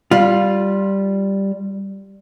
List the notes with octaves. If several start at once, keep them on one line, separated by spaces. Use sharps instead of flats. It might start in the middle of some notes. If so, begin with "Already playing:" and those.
G3 F4